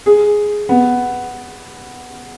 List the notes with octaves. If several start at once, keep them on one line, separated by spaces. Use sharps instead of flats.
G#4
B3